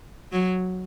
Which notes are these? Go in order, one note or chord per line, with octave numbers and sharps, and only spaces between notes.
F#3